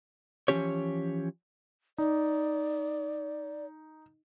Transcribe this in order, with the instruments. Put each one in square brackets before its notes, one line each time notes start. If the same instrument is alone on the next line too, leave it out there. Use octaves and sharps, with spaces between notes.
[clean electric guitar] E3 F3 C#4 G4 C#5
[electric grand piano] D#4 [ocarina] D5